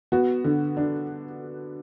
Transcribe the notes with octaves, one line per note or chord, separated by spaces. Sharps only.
B3 F#4
D3
D4